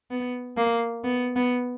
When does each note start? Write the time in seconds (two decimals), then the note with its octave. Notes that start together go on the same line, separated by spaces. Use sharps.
0.11 B3
0.57 A#3
1.04 B3
1.36 B3